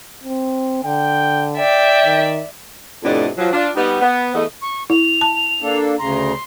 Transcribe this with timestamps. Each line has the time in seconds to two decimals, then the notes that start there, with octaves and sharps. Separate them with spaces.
0.24 C4
0.85 D3 G5
1.57 D5 E5 G5
2.05 D#3
3.03 F2 A2 C3 B3 D4 D#5
3.38 F3 F#3
3.52 D4 F4
3.76 G3 B3 D#4
4.01 B3
4.35 E2 A3 D#5
4.61 C#6
4.90 E4 F7
5.21 A5
5.62 A#3 D4 A4
5.99 D2 C#3 A#5 C6